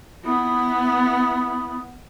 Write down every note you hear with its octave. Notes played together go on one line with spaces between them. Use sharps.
B3 E4 B5 D#6